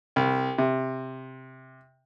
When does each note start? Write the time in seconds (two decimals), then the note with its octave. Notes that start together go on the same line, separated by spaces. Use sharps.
0.16 C2
0.58 C3